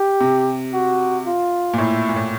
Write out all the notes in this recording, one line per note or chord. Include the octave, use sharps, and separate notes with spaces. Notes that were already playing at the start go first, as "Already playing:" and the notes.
Already playing: G4
C3
F#4
F4
A#2
A2 E4
A#2
A2